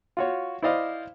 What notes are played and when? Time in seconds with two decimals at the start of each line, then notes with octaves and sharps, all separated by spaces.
0.17 F4 F#4 C#5
0.62 E4 C5 D5 D#5 F5